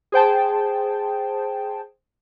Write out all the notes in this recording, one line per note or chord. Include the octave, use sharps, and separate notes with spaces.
G#4 C5 G5 A5